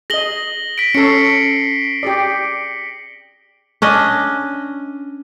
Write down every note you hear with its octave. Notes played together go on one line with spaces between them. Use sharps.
G#4 D#5 A#6 F#7 G7
B6 D7
C#4 A4 C7 C#7
G4 G#4 D5
C#4 D4 D#5